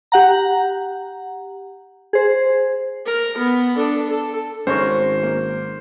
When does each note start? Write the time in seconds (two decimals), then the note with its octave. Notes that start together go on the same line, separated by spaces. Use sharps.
0.12 G4 F#5 A#5
2.13 G#4 C5
3.06 A#4
3.38 B3
3.75 D4 A4
4.09 A4
4.67 G#1 G#2 C#4 G#4 A#4 C5 C#5 C#6
5.23 A#3